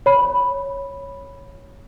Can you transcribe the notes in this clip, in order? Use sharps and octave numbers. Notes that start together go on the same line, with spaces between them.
C#5 B5